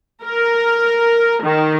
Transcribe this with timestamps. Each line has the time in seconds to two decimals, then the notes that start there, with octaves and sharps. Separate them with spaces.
0.23 A#4
1.42 D#3